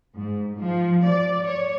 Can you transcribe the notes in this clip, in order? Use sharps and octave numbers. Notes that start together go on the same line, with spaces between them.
G#2
F3
D5
C#5